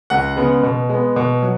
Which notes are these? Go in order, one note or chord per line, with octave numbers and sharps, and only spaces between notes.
C#2 F#5
C#3 G#3 B3
B2
G#3 B3
B2
F#3